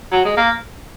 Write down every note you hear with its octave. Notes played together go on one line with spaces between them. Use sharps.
F#3
G#3
A#3